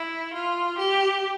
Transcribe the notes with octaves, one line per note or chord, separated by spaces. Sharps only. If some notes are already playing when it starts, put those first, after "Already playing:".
Already playing: E4
F4
G4